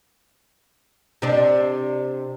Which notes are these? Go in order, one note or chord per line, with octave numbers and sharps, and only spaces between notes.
C3 D4